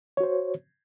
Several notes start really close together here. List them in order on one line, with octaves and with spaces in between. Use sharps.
C#5 F#4 C5